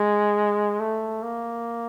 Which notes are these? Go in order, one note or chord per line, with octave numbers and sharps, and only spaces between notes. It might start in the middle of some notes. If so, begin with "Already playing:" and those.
Already playing: G#3
A3
A#3